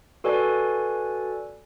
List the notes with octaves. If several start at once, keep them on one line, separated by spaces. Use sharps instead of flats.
F#4 A4 B4 D5 G#5